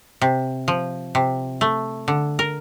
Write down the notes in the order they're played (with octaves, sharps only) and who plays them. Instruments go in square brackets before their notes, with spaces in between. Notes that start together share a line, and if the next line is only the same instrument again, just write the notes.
[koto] C3
F3
C3
A3
D3
A#4